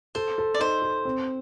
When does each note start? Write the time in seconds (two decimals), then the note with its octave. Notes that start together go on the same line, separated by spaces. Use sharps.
0.15 A4 C5
0.38 A4
0.54 D5
0.59 D#4 C5
0.82 A4
1.05 C4